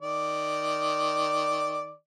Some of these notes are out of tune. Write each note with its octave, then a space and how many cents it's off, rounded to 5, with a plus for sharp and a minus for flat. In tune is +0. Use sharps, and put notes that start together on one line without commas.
D#3 +0 D5 +0